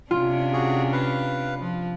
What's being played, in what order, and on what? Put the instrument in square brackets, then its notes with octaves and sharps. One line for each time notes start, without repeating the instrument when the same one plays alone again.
[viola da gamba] C3 C#4 D4 [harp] F4
[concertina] F#4 G#4
B4 F5
[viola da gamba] F3